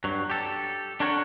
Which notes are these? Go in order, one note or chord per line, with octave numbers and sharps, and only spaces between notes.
G2 F#3
G4 A4
D4 A4 A#4 C#5 F#5 A5